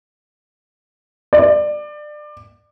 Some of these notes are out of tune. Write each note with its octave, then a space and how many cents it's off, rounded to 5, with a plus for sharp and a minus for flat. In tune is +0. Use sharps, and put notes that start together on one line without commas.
D5 +25